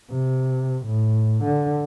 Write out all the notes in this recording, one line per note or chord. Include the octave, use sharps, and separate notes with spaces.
C3
A2
D3